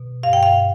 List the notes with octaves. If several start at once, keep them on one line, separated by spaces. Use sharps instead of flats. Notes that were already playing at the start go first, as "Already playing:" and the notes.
Already playing: B2
G2 F5
G5
F5